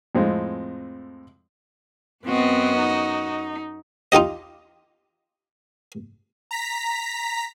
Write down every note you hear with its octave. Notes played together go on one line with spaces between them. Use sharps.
F2 A2 G#3 C4
F#2 B3 C4 F#4 D#5
D#4
D#4 F4 G4 D#5
A#5 B6